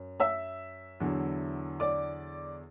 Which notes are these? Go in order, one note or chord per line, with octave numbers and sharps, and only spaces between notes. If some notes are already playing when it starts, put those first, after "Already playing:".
Already playing: F#2
E5 E6
E2 D3 F#3
D5 D6